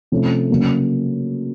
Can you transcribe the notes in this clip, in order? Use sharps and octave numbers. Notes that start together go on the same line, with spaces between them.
C3 F3 A3 C#4
C#3 F#3 A#3